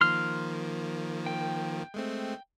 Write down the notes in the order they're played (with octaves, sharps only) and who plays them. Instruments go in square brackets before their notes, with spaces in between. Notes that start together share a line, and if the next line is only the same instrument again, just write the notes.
[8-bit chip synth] D#3 F3 A#3 [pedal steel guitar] C6 F6
[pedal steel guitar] G5
[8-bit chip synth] G#3 A3 C4